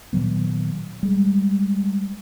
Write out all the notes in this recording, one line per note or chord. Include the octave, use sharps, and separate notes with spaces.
A#2 D#3 F#3 B3
G3 G#3